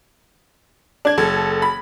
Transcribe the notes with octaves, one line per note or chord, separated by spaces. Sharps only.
D4 G#6
F#1 A4
B5